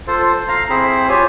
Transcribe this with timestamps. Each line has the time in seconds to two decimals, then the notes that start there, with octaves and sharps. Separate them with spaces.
0.07 F4 A4 C5
0.49 F5 A#5
0.70 C4 E4 G#4 C5 B5
1.09 F4 G4 C#5 G#5